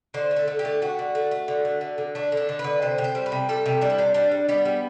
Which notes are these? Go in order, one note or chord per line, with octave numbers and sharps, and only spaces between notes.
D3 C5
A3
A4
D3
G4
A3
A3 F#4
D3
A3
A3
D3
A3
D3
D3
A3 D4
D3 D4
D3
B4
D3
C3 C5
C3
C5
G3
B4
C3
G3 A4
C3
G3 D4
E4
C3 D4
G3 D4
G3
G3 B3
G3